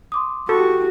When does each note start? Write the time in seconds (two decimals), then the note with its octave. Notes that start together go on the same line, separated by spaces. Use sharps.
0.12 C6 D6 D#6
0.49 F#4 G4 A4 C#6